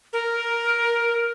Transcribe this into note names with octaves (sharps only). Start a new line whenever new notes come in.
A#4